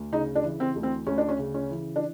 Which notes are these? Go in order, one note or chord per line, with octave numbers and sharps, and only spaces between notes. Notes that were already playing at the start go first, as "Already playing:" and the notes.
Already playing: D2
C#3 D#4
D4
E3
C4
D2
C4
D2 C#4
D4
C#4
C#3
C#4
E3
D4